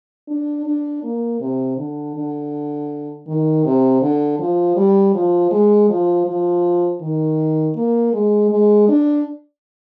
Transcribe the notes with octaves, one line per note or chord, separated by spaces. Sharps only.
D4
D4
A#3
C3
D3
D3
D#3
C3
D3
F3
G3
F3
G#3
F3
F3
D#3
A#3
G#3
G#3
D4